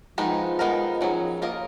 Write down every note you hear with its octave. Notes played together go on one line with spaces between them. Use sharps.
D#3 F3 G#3 B3 D#4
D#3 G#3 B3 D#4 A#4
D#3 F#3 C#4 G#4
A#3 F4 A#4 D#5